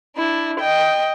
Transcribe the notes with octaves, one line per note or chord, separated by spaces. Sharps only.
D4 E4
D#5 G5